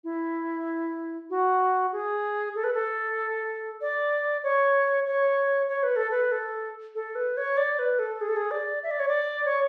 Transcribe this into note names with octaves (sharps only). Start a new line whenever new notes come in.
E4
F#4
G#4
A4
B4
A4
D5
C#5
C#5
C#5
B4
A4
B4
A4
A4
B4
C#5
D5
B4
A4
G#4
A4
G#4
D5
E5
D5
C#5
D5
C#5